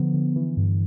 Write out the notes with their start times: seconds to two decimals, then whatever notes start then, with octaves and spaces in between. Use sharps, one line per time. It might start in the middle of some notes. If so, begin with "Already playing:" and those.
Already playing: D3 F3 B3
0.14 D3
0.36 E3
0.57 G2